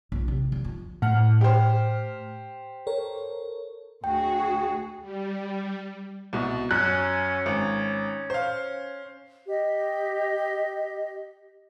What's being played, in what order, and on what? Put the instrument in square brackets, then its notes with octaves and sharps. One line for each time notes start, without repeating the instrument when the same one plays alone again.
[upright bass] A#1
C3
D3
F3
[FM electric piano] A2 F6 [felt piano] F#5
[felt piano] G4 C5
[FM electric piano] A4 A#4 C#5
[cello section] D2 F#4 G#4 [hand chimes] G5
[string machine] G3
[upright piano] C2 B2
[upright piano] F#2 [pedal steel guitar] C#4 F#6
[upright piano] G#1
C5 F5
[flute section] G4 D#5